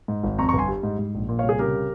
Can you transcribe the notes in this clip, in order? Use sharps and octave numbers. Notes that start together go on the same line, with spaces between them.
G#2
G#1
F2 A#5 C#6
A#5 C#6
G1
G#5 C6
G3
G#2
G#2
A#1
A#2
C#5 F5
C2
G#4
C#3 G4 A#4